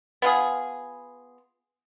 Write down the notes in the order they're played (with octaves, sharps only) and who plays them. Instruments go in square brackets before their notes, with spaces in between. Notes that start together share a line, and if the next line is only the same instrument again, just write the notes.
[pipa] B3 F4 G#4